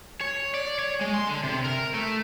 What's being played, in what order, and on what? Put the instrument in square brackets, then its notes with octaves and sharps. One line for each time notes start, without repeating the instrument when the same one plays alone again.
[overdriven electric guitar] C#5
D5
C#5
G#3
C6
D3
C3
A#4
A3